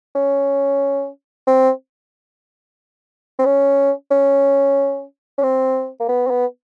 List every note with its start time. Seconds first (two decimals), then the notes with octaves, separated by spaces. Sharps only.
0.15 C#4
1.47 C4
3.39 C4
3.45 C#4
4.11 C#4
5.38 C#4
5.43 C4
6.00 A#3
6.08 B3
6.27 C4
6.30 B3